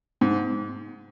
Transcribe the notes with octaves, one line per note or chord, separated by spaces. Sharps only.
G#2